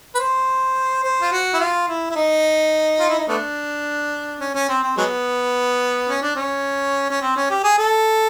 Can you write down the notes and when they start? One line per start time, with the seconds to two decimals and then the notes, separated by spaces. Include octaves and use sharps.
0.15 B4
0.19 C5
1.03 C5
1.21 F4
1.32 F#4
1.54 E4
1.60 F4
1.88 E4
2.10 E4
2.16 D#4
3.00 F4
3.09 E4
3.19 D#4
3.28 A3 B3 D4
4.40 C#4
4.55 C#4
4.69 C4
4.83 C4
4.97 F#3 G#3 B3
6.09 C#4
6.22 D4
6.36 C#4
7.10 C#4
7.22 C4
7.36 C#4
7.50 G4
7.64 G#4
7.78 A4